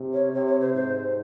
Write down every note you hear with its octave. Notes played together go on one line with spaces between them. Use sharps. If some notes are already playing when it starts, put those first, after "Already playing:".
Already playing: C3
C#5
C3 C#5
C#5
C5
G#2 C5